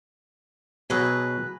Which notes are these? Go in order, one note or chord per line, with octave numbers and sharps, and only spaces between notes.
B2 F#3 G#4 B4 A#5